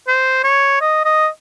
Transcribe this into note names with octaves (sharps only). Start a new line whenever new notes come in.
C5
C#5
D#5
D#5